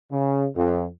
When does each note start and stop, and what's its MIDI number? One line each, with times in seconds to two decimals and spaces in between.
0.12 0.47 49
0.55 0.86 41